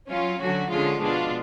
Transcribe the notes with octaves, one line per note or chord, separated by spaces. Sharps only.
F#3 C#4 F4
D3 F#3 C#4 F#4
D3 F3 G#3 C#4 F4
B2 G#3 D4 F4